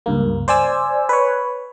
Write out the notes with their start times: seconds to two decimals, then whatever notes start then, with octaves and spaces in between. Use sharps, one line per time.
0.06 C#2 G2 A#3
0.48 C5 D5 G#5 E6
1.09 B4 C#5